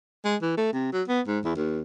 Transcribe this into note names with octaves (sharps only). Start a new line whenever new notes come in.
G#3
E3
A3
C3
F#3
B3
G#2
E2
D#2